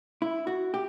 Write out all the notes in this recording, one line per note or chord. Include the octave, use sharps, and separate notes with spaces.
E4
F#4
G4